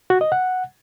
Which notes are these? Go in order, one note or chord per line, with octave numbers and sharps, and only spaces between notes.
F#4
D#5
F#5